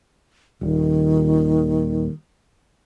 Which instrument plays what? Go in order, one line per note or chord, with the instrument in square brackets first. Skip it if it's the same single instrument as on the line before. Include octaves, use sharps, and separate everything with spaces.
[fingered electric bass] D#1 [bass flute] D#3